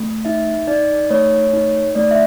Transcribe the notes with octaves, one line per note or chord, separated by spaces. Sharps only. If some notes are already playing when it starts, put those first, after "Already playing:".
Already playing: A3
D#4 E5
D#4 D5
A3 C#5
D#4
A3 D5
E5